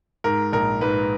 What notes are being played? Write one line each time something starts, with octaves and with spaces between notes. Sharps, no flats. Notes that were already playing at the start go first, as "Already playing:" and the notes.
G#2 A#4
A#1 A#4
G#2 B4